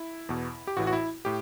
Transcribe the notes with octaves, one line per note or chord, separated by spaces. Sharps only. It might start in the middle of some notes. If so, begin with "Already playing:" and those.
Already playing: E4
E2 B2
G4
A1 A2 E3 F#4
F#4
E4
A2 G4